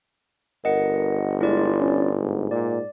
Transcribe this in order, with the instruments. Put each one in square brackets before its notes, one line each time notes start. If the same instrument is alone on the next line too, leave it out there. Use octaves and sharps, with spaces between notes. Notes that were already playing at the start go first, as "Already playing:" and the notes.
[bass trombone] G1 [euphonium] A#4 [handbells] D#5 F#5
[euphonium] G#3 [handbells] E4 F4 D5
[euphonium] C#4
G#2
[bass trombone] A#2 [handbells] D5